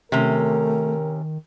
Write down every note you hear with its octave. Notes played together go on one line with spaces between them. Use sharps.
C3 D#3 A3 C#4 A#4